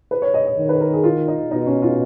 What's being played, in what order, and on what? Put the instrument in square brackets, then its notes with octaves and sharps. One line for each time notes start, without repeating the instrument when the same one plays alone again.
[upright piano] B4
C#5
D#5
D#5
[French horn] D#3
[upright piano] B4
A#4
G#4
F4
D#4
[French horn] B2 [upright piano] D#4
[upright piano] C#4
F4